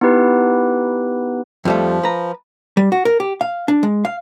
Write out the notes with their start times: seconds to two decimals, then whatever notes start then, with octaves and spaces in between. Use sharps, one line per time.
0.01 B3 D#4 E4 G4 B4
1.65 F2 F3 G3 A3
2.03 B4 A#5
2.77 G3
2.92 F#4
3.05 A#4
3.20 G4
3.41 F5
3.68 D4
3.83 G#3
4.05 F5